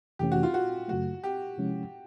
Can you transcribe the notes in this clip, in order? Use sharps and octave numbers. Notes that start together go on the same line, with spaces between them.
F2 C3 E3 A3 C#4 G4
F#4
F4
F#4
F#2 C#3 F#3 A3 F#4
G4
C3 F3 G#3 C#4 E4